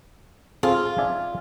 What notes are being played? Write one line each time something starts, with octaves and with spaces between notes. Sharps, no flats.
C4 F4 G#4 A4
D5 E5 G#5